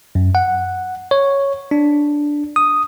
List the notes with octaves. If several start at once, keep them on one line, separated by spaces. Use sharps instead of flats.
F#2
F#5
C#5
D4
D#6